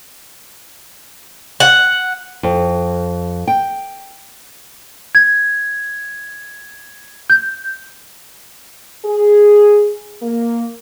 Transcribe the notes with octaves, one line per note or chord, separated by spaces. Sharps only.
F#5
F2
G5
G#6
G6
G#4
A#3